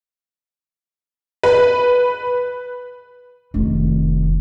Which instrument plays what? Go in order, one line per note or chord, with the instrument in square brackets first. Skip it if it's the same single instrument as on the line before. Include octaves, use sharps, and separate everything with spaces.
[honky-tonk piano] B4
[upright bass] F1 D#3